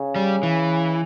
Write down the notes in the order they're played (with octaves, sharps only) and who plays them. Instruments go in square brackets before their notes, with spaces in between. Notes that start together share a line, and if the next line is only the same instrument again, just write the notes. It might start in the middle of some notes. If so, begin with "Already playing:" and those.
Already playing: [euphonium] C#3
[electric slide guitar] G3
E3